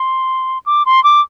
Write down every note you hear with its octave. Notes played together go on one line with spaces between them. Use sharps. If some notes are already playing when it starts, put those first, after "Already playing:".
Already playing: C6
D6
C6
D6